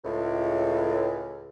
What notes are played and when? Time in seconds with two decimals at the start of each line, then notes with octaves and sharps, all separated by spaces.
0.04 C#2 A2